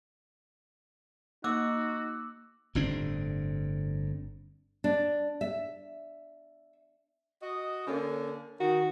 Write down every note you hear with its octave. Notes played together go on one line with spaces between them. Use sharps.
A#3 D#4 F#4 D6 E6
G1 A2 C4 D4
D4
E5
F#4 D#5
D3 A#3 C#4
D#3 F#4